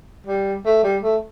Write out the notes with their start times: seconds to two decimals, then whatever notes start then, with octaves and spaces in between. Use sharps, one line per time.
0.27 G3
0.65 A3
0.83 G3
1.03 A3